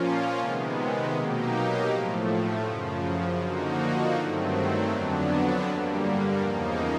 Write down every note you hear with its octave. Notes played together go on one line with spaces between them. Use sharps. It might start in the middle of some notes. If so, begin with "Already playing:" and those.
Already playing: A#2 F3 A#3 C#4 F4
C3 D#3 G#3 B3
B2 F#3 A#3 D#4 G4
A2 F3 A3
F#2 C#3 F3
D3 F3 A#3 D#4 F#4
G2 D#3 F#3 A3 C4
F2 D3 F#3 B3 D4
G2 D3 G3 A#3
E2 C#3 F3 A#3 D#4